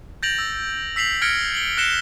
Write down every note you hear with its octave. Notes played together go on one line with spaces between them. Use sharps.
G6 A6 A#6 D7 F7 F#7
E6
E6 B6 C7 F7 F#7
F6 G#6 A#6 C#7 D7 G7
F#7 G7
F#6 A#6 C7 C#7 E7 G7